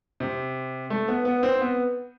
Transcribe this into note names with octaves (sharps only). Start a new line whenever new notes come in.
C3
A3
B3
B3
C4
B3